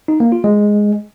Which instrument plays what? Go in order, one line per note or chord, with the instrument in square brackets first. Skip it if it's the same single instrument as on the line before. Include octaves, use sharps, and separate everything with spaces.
[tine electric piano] D#4
A#3
F4
G#3